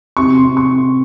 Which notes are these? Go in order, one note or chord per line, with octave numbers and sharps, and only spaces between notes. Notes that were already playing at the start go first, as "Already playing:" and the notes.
C3 C#6
C6
C3
C#6
C3